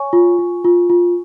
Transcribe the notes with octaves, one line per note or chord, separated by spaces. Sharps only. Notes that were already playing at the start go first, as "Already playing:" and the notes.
Already playing: C#5 G#5 C#6
F4
F4
F4
F4